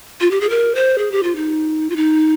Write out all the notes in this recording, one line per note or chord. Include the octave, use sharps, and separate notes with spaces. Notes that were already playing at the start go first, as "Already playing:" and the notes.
F4
G4
G#4
A#4
C5
G#4
G4
F4
D#4
F4
D#4